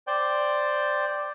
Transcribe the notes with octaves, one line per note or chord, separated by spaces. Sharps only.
C5 D5 G5